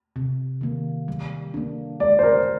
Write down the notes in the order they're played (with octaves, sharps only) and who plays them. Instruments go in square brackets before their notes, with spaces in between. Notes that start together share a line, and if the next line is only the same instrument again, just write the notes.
[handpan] C3
D#3 A#3
G3
A#3 D4
[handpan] G#3 [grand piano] D5
[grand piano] C5
A#4